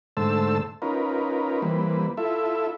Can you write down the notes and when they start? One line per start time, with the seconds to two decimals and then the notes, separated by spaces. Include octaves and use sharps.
0.17 G#2 D3 A3 C5 A5 E6
0.82 C#4 D#4 F4 A#4 B4
1.62 E3 G3 A#3 C4 B4
2.17 E4 F4 A4 E5